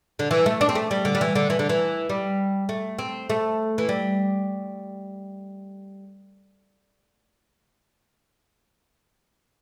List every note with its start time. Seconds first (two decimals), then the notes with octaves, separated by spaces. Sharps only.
0.19 D3
0.31 E3
0.46 A3
0.61 D4
0.69 C4
0.75 A3
0.91 G3
1.05 D3
1.15 G3
1.21 E3
1.35 D3
1.50 E3
1.59 D3
1.69 E3
2.09 G3
2.69 A3
2.99 C4
3.30 A3
3.78 E3
3.89 G3